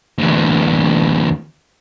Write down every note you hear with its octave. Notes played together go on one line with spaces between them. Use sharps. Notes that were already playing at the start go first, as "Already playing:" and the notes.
D2 E3